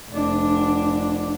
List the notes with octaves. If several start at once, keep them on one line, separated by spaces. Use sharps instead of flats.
F1 D4